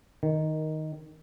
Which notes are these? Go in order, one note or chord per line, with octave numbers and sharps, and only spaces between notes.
D#3